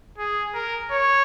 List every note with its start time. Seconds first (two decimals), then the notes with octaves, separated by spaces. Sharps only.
0.18 G#4
0.54 A#4
0.91 C#5